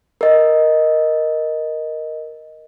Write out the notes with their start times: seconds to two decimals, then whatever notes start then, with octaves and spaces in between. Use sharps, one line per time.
0.21 A#4 D#5